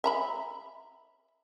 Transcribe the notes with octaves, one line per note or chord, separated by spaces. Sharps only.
E5 A#5 B5